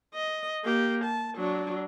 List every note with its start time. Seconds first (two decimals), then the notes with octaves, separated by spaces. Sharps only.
0.15 D#5
0.64 A#3 G4
1.04 A5
1.37 F#3 D4